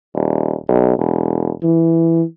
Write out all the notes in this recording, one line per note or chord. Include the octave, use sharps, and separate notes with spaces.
D#1
B1
E1
E3